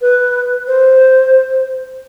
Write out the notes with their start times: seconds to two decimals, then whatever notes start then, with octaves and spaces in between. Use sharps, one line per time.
0.01 B4
0.67 C5